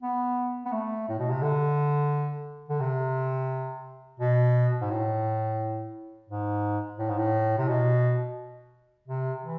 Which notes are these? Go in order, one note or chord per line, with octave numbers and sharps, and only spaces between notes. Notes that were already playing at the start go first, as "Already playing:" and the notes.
B3
B3
A3
A2
B2
C3
D3
D3
C3
B2
G#2
A2
G#2
A2
G#2
A2
C3
B2
C3
E3